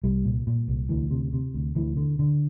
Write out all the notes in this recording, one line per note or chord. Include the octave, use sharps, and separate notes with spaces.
C2 G3
A#2
A#2
C2
D2 E3
C3
C3
D2
D2 E3
D3
D3